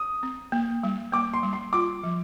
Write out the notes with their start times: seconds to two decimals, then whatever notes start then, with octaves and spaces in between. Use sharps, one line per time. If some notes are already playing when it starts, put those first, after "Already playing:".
Already playing: D#6
0.23 C4
0.52 A#3
0.83 G3
1.12 A#3 D6
1.34 C6
1.43 G3
1.53 C6
1.73 F4 D6
2.04 F3